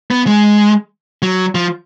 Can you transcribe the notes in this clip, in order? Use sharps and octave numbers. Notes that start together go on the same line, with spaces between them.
B3
G#3
F#3
F3